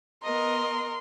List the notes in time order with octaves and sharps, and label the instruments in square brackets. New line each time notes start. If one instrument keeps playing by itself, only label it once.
[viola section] B3 D#5 [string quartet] A#4 [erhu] C6